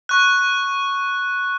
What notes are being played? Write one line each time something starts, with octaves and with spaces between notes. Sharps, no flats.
C#6 F#6